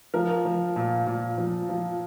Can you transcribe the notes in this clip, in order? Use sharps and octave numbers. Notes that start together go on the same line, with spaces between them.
F3 A#4
F3
A#2
A#2
F3
F3